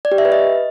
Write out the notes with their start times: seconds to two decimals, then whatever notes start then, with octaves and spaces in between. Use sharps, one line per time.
0.05 D5
0.12 G4
0.18 E5
0.25 B4
0.32 D#5